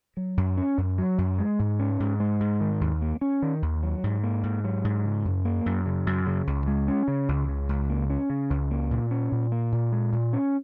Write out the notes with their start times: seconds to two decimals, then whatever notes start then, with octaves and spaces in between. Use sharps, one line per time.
0.17 F#3
0.37 F#2
0.57 C#4
0.78 F#2
0.98 F#3
1.18 F#2
1.39 G#3
1.59 G#2
1.80 C#4
2.00 G#2
2.20 G#3
2.41 G#2
2.61 D#3
2.81 D#2
3.02 A#3
3.21 C#4
3.42 D#3
3.62 D#2
3.83 F#3
4.03 G#2
4.24 A#3
4.43 G#2
4.64 F#3
4.84 G#2
5.05 C#3
5.25 F#2
5.45 A#3
5.66 F#2
5.86 C#3
6.06 F#2
6.27 C#3
6.47 C#2
6.67 G#3
6.88 C#4
7.08 C#3
7.28 C#2
7.48 C#3
7.69 C#2
7.89 A#3
8.10 C#4
8.30 C#3
8.50 C#2
8.71 A#3
8.91 A#2
9.11 C#4
9.32 A#2
9.52 A#3
9.72 A#2
9.92 G#3
10.13 A#2
10.33 C#4